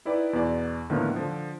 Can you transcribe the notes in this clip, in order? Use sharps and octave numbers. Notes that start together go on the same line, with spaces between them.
D#4 E4 B4 D5 G5
E2 B2 F#4 D5
A2 D3 D#3 F3 A#3 B3
D3 F3